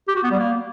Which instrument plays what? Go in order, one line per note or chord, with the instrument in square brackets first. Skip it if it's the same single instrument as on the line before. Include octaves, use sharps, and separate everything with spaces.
[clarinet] G4
F#4
B3
G3
A#3